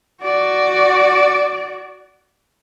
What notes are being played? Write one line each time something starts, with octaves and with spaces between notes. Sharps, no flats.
F#4 D5